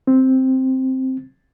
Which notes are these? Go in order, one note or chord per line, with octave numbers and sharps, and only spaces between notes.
C4